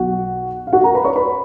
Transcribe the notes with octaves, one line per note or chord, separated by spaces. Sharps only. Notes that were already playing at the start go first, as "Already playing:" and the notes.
Already playing: B1 B2 F#4 F#5
F5
F#4 F#5
A#4 A#5
B4 B5
C#5 C#6
B4 B5